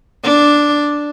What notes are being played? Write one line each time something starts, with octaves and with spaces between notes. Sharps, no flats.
D4